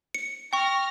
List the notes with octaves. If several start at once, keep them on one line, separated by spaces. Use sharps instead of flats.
C#7
G5 C#6 F6 A#6